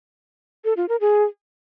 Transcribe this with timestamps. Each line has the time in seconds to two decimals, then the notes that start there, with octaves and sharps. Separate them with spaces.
0.65 A4
0.77 F4
0.89 A#4
1.01 G#4